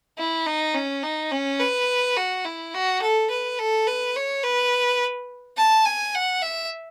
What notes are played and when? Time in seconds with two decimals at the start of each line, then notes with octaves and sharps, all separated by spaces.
0.18 E4
0.46 D#4
0.75 C#4
1.03 D#4
1.31 C#4
1.60 B4
2.17 F#4
2.45 E4
2.74 F#4
3.02 A4
3.30 B4
3.59 A4
3.87 B4
4.16 C#5
4.44 B4
5.57 A5
5.85 G#5
6.15 F#5
6.42 E5